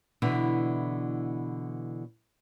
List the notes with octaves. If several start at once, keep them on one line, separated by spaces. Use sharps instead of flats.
B2 D3 E3 E4